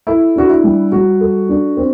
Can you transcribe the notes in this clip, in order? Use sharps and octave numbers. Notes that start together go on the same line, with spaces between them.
E4 A4
D4 F#4
E4
G3
G3 F#4
A4
D4
C4